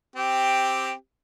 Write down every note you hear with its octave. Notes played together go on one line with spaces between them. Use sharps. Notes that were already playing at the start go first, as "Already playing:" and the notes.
C4 G4